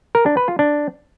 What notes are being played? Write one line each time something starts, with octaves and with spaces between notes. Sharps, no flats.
A#4
D4
B4
F4
D4